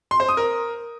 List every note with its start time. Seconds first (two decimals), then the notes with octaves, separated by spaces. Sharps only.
0.11 C6
0.20 C5
0.29 D#6
0.37 A#4